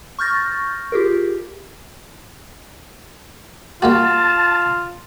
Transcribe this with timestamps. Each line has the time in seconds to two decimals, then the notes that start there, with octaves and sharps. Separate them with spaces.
0.19 C#6 F6 G6 A6 A#6
0.92 F4 G4 G#4 A#4
3.82 G3 A#3 F4 F#4 A5